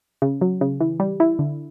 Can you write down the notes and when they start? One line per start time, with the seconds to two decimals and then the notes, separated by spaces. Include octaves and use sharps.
0.22 C#3
0.41 F#3
0.61 C#3
0.81 E3
1.00 G3
1.20 E4
1.39 D3